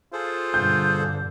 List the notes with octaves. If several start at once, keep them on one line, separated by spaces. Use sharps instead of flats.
F4 G#4 A4 C5
G2 B2 D3 G6